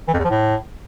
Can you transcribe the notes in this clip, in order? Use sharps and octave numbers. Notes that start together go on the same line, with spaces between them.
E3
F2
E2
F3
A2